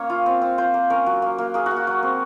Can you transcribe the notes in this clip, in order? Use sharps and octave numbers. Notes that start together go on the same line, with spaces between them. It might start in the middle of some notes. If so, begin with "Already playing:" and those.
Already playing: A#3 C#4 C#5
F4
C4
C4
F4 C5
A#3
C#4 A#4
F#3
A#3
A#3
A#3 G#4
F#4
A#3
F#4
F#3 F#4
C4